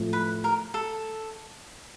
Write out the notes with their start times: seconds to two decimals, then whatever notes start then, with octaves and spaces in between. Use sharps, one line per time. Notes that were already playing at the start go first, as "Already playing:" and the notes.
Already playing: A2 F3 A3 C4 F4
0.13 B4
0.44 A#4
0.74 A4